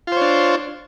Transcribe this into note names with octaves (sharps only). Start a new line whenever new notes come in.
D4 F4 C5 C#5